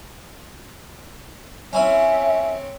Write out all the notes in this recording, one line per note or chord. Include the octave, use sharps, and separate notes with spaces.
C4 C#4 E4 C#5 E5 G#5